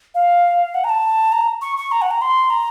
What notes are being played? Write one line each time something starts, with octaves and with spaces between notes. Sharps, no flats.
F5
F#5
A#5
A5
A#5
C#6
C#6
A#5
F#5
A#5
C6
A#5